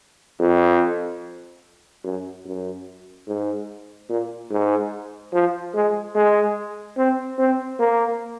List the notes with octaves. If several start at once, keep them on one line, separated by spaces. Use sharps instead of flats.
F2
F#2
F#2
G#2
A#2
G#2
F3
G#3
G#3
C4
C4
A#3